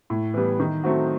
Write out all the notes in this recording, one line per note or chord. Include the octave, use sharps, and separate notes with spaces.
A2
E3 G3 B3
D#3
F#3 A3 C4 F#4